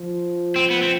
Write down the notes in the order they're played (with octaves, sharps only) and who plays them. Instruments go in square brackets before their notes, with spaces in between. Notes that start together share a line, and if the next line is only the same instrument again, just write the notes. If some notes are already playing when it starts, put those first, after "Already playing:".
Already playing: [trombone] F3
[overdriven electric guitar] C4
B3
C4